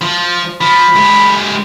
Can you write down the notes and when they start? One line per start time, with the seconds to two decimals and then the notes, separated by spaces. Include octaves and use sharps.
0.01 F3
0.61 F3 B5
0.95 G#3 G4